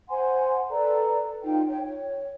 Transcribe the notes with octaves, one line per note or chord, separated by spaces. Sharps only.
C5 F#5 G#5 C6
A4 B4 D5 A#5
D#4 F4 G5
C#5 G5
C#5